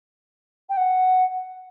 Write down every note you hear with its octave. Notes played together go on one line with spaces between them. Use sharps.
G5
F#5